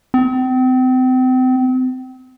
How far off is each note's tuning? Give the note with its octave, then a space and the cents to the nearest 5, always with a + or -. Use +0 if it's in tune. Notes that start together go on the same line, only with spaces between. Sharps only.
C4 -35